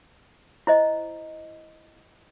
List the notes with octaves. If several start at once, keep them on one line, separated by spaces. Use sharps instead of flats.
E4 C5 D#5